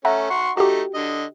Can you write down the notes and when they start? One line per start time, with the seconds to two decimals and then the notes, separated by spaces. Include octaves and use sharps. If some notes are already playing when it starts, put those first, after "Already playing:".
0.05 A3 C#4 E5 F#5 A#5
0.30 F#4 C6 C#6
0.57 A3 D#4 F#4 G4
0.94 D3 D#5